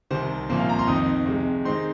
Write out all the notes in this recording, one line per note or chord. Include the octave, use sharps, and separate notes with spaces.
C2 C3 D#3 C5
C2 A#2 F3 A#3 C5
F5
A#5
C6
F2 D#3 C4 D#4 D#6
F2 C3 G#3
D#3 G#3 C4 D#4 C6